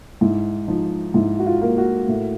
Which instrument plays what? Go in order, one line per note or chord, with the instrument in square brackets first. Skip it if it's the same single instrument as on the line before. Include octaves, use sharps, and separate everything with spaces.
[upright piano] G#2 E4
F3 D#4
G#2 E4
F#4
F4
A#3
F#4
A2